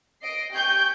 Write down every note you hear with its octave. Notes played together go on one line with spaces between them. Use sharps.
D#5 C7 D7
G4 G5 G#5 C#6 G6